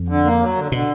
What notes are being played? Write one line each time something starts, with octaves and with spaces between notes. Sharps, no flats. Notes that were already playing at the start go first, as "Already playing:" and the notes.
Already playing: F2
D3
A#3
F#3
D3
B2 D3